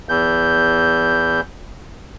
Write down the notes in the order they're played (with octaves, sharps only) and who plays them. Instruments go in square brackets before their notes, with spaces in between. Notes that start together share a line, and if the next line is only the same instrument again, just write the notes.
[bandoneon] E2 G6